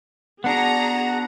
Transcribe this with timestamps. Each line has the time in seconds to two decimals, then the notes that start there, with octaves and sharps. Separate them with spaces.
0.44 B3 D4 F#4 G#4 F#5 A#5